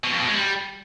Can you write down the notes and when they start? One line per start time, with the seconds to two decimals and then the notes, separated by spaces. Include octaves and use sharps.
0.04 B2
0.12 F2
0.20 B2
0.28 G#3
0.36 G3